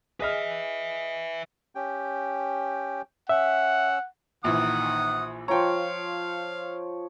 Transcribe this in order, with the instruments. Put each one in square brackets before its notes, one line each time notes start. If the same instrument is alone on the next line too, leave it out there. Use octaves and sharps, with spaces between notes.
[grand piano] G#4 D#5 F6 [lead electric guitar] B4 E5
[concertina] C#4 G4 G5
[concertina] C#4 E6 [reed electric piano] E5 [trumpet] F#5
[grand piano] A#1 E3 [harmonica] D#3 F#5 D#6
[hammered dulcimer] F3 F4 C#5 [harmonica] F5 [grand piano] G5 A#5